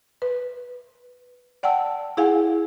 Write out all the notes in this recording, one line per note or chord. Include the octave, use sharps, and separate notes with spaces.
B4
D5 F#5 G5 A5 E6
E4 G#4 F5 F#5 G#5